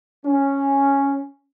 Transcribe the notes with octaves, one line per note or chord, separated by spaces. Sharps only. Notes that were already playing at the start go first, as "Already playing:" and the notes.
C#4